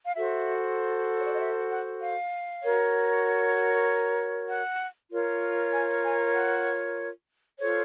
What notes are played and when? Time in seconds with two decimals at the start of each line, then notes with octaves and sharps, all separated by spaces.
0.06 F5
0.16 F#4 A4 C5 E5
1.18 C#5
1.26 D5
1.33 D#5
1.40 E5
1.71 F#5
2.02 F5
2.63 F#4 A#4 C#5
4.49 F#5
5.12 F4 A#4 C#5
5.73 G#5
6.04 G#5
6.34 F#5
7.59 F4 A4 C5 C#5